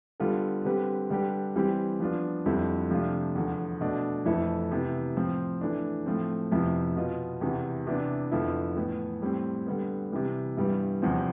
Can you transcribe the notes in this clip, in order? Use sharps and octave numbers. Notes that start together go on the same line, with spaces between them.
D3 G3 B3 F4 A4
D3 G3 C4 G4 B4
D3 G3 D4 G4 B4
E3 G3 C4 G4
F3 B3 D4 F4
F2 D3 G3 C4 E4
C3 F3 A3 D4 F4
E2 D3 F3
B2 A3 D4
F2 E3 A3 E4 A4
C3 E3 B3 E4
A2 F3 C4
E3 A3 D4
A2 F3 A3 C4
F2 C3 F3 B3 E4
B2 B3 F4
E2 C3 E3
C3 E3 B3 D4
F2 D3 F3 B3 E4
A2 E3 B3
A2 G3 C4
D3 G3 B3
C3 E3 G3
G2 E3 G3 B3
E2 C3 F3 C4